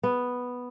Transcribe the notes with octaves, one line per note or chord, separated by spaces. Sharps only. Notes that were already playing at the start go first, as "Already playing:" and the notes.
B3